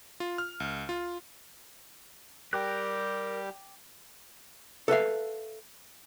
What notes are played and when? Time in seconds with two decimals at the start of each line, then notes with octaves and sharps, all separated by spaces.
0.20 F4
0.38 F6
0.60 C#2
0.89 F4
2.53 G3 G4 A#4 G5 D6 F#6
4.88 A4 B4 E5 F5